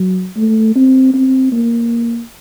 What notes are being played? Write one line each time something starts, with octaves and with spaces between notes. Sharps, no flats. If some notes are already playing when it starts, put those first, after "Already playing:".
Already playing: F#3
A3
C4
C4
A#3